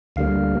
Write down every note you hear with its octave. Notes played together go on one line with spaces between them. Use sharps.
D2 D3 G3 A#3 F5